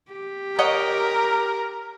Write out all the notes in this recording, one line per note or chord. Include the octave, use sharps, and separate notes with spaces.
G4
A#4 C#5 D#5 F#5